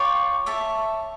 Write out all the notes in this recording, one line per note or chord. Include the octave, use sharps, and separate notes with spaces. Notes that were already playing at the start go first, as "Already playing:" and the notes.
Already playing: F4 C#5 G5 D6
C#5 E5 A5